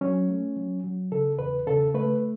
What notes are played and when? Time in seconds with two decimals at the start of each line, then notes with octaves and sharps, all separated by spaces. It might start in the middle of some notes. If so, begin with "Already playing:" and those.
0.01 F#3 C#4
0.29 A3
0.56 F#3
0.84 F#3
1.12 C#3 A4
1.39 E2 B4
1.67 C#3 A4
1.94 A3 B4